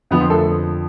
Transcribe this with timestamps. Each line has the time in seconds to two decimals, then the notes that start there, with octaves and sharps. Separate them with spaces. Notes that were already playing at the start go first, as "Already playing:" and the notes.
0.11 F2 D3 F3 B3 B4
0.21 C4 C5
0.30 A3 A4